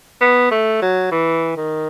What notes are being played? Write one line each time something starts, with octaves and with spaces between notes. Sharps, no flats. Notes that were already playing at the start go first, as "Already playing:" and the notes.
B3
A3
F#3
E3
D#3